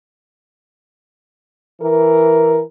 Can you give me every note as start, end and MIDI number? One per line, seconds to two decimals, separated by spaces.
1.80 2.60 52
1.80 2.60 70